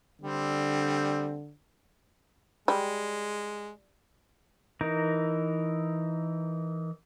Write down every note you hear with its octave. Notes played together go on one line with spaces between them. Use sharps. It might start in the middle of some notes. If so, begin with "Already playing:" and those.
D3 G3 C4
G3 G#3
E3 D#4 A#4